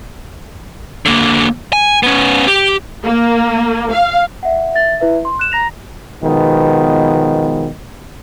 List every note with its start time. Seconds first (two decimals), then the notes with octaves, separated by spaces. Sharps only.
1.06 D3 A#3
1.73 G#5
2.03 B3 C#4
2.47 G4
3.04 A#3
3.93 F5
4.43 E5 F#5
4.74 E5 A6
5.00 E4 B4 E5
5.25 C6
5.39 F#6 E7
5.52 A#5 A#6 F7
6.22 B2 D#3 F3 G#3 B3